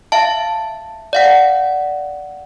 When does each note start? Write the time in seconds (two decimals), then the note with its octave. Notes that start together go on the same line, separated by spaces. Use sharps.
0.12 E5 F5 A5
1.13 D5 F5 F#5